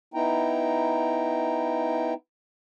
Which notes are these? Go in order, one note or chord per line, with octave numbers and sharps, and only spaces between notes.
B3 D#4 E4 G5 A#5